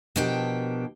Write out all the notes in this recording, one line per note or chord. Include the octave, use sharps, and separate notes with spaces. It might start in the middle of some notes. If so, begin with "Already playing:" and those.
B2 F3 D4 G4 A#4 G5